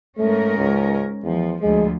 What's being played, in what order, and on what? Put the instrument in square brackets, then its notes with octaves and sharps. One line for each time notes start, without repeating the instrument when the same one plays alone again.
[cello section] G#2 C#4 A#4 [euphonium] A3
[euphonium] C#2
[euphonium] E2 [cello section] F3
[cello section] D2 F3 [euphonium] G#3